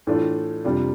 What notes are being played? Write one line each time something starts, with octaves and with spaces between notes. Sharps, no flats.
A2 E3 A3 D4 F4
F2 C3 G3 D4 F4